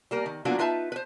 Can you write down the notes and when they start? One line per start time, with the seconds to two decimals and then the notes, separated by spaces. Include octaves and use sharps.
0.11 G3 A#3 A#4
0.26 D#3
0.45 F#3 A#3 B3 D4 F4 F#4
0.59 D#4 F4 B4 E5 A5
0.92 B4 C5